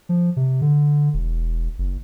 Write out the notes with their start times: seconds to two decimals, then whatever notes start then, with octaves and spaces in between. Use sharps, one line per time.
0.09 F3
0.37 C3
0.62 D3
1.14 E1
1.78 F#1